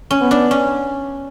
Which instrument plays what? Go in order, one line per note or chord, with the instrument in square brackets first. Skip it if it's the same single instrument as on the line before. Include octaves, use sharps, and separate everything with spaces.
[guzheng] C#4
[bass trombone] B3
[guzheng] D4
C#4